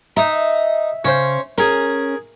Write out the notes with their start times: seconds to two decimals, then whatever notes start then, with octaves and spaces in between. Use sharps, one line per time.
0.17 D#4 D#5 E5 A#5
1.05 C#3 C#4 C5
1.58 C#4 G#4 A#4